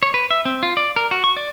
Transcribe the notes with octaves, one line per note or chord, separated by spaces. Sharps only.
C#5
B4
E5
C4
F4
D5
A#4
F#4
C#6
D5